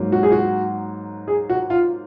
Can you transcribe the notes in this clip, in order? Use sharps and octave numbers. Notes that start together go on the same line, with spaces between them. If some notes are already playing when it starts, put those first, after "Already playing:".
Already playing: G#2 F#3 A#3
F#4
G#4
F#4
G#4
F#4
F4